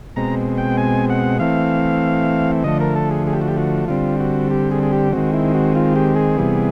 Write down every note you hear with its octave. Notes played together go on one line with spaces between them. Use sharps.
B2 G#3 C4 A#5
G5
G#5
F#5
E3 A3 C4 F5
D3 F3 A3 D#5
A#4
A4
G#4
G#4
G4
F#4
G4
F#4
D3 G3 C4 F4
F#4
G4
G#4
G#4
G4
D#3 G#3 C4 F#4
E4
F#4
F4
G4
G#4
C3 E3 G3 B3